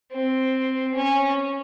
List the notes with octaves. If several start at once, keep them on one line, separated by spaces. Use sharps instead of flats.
C4
C#4